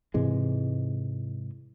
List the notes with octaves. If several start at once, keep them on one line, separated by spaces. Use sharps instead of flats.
G#2 C3 E3 G#3